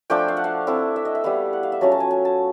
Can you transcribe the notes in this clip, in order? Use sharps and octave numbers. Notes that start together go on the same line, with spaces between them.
F3 A3 D4 F4 G5
F5
F#5
F5
A3 C4 E4
E5
D#5
E5
G3 B3 E4 F5
F#5
F5
E5
F#3 A3 C#4 F4 A5
A5
G#5
G#5
A5